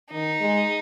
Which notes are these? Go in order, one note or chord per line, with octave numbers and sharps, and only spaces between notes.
D#3 D#4
G#3